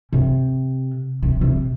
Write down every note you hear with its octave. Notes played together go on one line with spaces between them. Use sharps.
C3
C3
C3